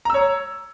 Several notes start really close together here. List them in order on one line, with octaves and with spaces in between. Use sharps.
A#5 E6 C#5